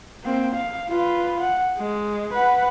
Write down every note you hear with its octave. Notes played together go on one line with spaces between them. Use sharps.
A#3 C4
F5
F4 B4
F#5
G#3
B4 F#5